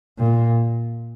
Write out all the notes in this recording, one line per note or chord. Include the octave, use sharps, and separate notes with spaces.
A#2